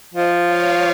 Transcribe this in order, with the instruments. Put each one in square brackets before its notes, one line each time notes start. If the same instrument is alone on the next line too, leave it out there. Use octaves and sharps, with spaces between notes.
[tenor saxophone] F3 [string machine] C5 D#5
[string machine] C#5 F5